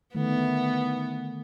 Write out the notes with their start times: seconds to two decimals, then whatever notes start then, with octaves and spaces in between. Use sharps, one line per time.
0.15 D3 D#3 A3 B3